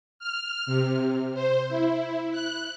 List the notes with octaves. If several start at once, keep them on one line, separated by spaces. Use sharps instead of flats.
F6
C3
C5
E4
F#6